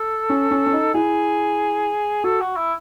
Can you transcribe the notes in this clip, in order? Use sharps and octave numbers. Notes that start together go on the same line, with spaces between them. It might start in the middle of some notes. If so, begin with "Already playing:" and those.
Already playing: A4
C#4
C#4
C#4
D#4
E4 G#4
F#4 A4
F#4
E4